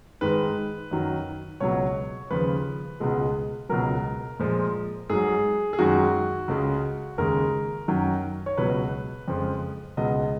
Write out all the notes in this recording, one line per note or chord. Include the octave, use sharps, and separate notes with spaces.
G#2 D#3 G#3 B4
F#2 D#3 F#3
C#2 B2 F#3 C#5
D#2 C#3 F3 B4
C#2 B2 G#3
C#2 B2 F#3 A#4
A#2 F3 G#3
G#2 F#3 G#4
G#4
F#2 D#3 G#3 F#4
C#2 C#3 G#3
D#2 C#3 G#3 A#4
F#2 D#3 F#3
C#5
C#2 B2 F#3 B4
F2 C#3 F3 G#3
C#2 B2 G#3 D#5